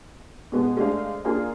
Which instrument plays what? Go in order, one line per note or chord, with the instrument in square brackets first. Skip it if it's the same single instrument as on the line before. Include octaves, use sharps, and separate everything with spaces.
[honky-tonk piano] B2 G#3 B3
G#3 A3 D4 C5 F5
A#3 D4 F4 G#4 A#4